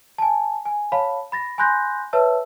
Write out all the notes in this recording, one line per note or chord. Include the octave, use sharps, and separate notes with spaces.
G#5 A5
G#5
C#5 F5 A5 B5
B5 A6 A#6
G#5 B5 C6 F#6 G6 A#6
B4 C#5 E5 A5 E6